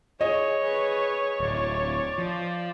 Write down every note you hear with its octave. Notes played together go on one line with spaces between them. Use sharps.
G#4 C#5 D#5
G#4 B4
D1 D5
F3